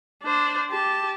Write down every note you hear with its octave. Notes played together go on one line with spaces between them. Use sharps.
D4 C5
G4 A5